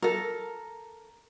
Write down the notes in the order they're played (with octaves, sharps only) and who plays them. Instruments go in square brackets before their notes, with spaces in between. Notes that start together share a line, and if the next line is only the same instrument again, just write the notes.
[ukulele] A4 A#4